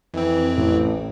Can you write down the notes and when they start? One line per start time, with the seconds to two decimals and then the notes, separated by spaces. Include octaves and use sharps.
0.14 F2 E3 C4
0.57 A1 A2